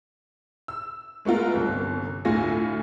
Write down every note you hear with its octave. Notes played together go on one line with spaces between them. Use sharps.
E6
G#3 A3 B3 F4 A#4
G1 C2 F#2
D2 A2 A3 F4 G#5 A#6